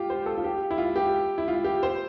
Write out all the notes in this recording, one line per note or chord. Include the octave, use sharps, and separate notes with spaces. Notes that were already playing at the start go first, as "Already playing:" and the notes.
Already playing: F4 G4
C5
A4
F4
G4
E4
F4
G4
E4
F4
G4
C5